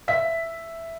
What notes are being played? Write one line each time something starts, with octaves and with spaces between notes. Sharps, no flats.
E5 B6